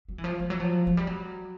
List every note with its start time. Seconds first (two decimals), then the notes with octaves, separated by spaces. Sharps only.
0.09 F#3
0.18 E3
0.24 F3
0.40 F3
0.50 F#3
0.60 F3
0.87 F#3
0.97 G3
1.07 F#3